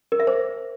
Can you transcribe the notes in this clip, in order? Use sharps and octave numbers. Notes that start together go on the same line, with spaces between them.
A#4
E5
C5